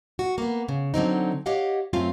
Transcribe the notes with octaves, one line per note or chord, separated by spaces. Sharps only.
F#4
A#3 B3
C#3
D3 F#3 C4 D#4
G4 C#5 D#5 F5 F#5
F#2 A3 C4 F4 E5 F5